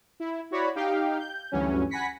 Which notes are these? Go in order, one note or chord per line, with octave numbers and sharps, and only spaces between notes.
E4
E4 F#4 C#5 D5 B5
D#4 G4 F5 G5
G6
D2 G2 E3 F#3 C#4
F#5 G#5 B5 A#6 B6 C#7